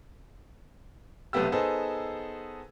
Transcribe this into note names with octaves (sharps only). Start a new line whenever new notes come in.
B1 C3 A3 B3 G4 E6
B3 D#4 G#4 A4 C5